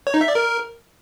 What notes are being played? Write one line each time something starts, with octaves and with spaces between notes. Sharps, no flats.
C#5
D#4
E5
D5
A#4